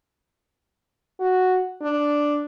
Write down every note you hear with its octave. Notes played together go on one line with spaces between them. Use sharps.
F#4
D4